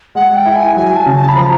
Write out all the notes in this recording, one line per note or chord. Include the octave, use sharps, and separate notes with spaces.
G#3 F#5
G5
E4
G#5
F#3 G#5
A5
C#3
A5
B5
F3 A#5